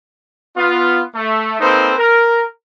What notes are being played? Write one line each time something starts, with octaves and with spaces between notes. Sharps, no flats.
B3 F4
A3
A#3 C4 D#4 A4 B4 C5
A#4